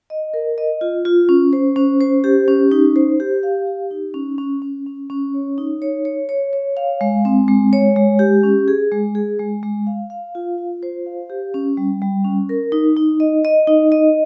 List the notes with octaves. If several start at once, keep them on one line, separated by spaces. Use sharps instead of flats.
D#5
A#4
D#5
F4
F4
C#4
C5
C#4
C5
G4
C#4
D#4
C5
G4
F5
G4
D#4
C#4
C#4
C#4
C#4
C#4
C#5
D#4
C#5
C#5
C#5
C#5
F5
G#3
C4
G#3
C#5
G#3
G4
C#4
G#4
G#3
G#4
G#3
G#3
F5
F5
F4
F4
C5
F5
G4
C#4
G3
G3
C#4
A#4
D#4
D#4
D#5
D#5
D#4
D#5